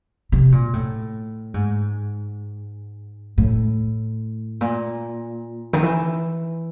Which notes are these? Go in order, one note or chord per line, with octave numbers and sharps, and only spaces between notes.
C3
A#2
A2
G#2
A2
A#2
D#3
E3